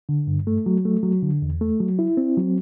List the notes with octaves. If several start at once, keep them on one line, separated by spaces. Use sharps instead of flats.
D3
G2
A3
F#3
A3
F#3
D3
E2
A3
F#3
E4
C4
F#3